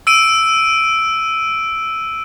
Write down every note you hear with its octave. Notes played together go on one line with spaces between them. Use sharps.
E6 D7 D#7